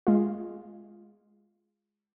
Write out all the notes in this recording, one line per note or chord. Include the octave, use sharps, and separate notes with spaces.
G#3 F4